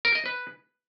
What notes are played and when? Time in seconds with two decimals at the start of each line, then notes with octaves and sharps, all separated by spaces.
0.05 A#4
0.15 D#5
0.26 B4